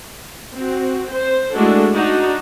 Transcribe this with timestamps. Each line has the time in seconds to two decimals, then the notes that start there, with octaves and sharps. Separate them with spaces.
0.55 C4 F#4
1.13 C5
1.55 G#3 A3 D4 E4 F#4 A4
1.94 D4 D#4 F#4